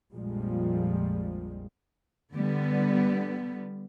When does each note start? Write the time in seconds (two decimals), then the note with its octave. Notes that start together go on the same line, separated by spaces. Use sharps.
0.14 A#1 F2 A#2 F3 G3 G#3
2.32 D3 G3 B3